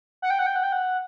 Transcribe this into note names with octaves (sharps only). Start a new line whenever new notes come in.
F#5
G5
F#5
G5
F#5
G5
F#5